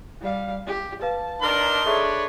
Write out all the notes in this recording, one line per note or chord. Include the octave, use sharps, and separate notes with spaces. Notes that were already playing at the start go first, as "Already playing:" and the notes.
G3 F5
G4
B4 F5 A5
D4 D#4 A#4 C6
D4 G#4 A4 B4 C#5 E5